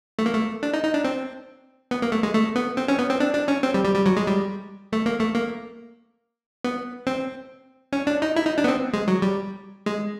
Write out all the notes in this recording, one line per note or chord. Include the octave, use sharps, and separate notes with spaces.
A3
A#3
A3
D4
D#4
D#4
D4
C4
B3
A#3
A3
G#3
A3
B3
C4
C#4
B3
C4
D4
D4
C#4
C4
G3
G3
G3
F#3
G#3
G3
A3
A#3
A3
A#3
B3
C4
C#4
D4
D#4
E4
D#4
D4
B3
C4
G#3
F#3
G3
G#3